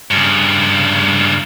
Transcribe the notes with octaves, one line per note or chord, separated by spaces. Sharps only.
G2 C#3